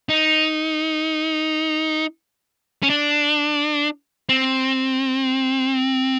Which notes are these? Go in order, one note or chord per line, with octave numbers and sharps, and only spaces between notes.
D#4
C#4
D4
C4